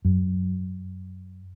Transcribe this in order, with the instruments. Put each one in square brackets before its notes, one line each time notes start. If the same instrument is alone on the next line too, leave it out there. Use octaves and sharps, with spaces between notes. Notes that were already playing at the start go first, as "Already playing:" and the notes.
[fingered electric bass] F#2